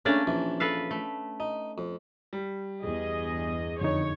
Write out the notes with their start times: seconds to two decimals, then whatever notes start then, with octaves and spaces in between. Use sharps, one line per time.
0.05 C#3 A3 A#3 C#4 D4 D5
0.27 A#1 E3
0.60 A4 B4 F5
0.91 A3
1.40 D#4
1.78 F2
2.33 G3
2.83 E2 G2 G#4 D#5
3.81 F2 D3 D#4 C#5